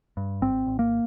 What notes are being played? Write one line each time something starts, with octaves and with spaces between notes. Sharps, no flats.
G2
G#1 C4
G#1
A#3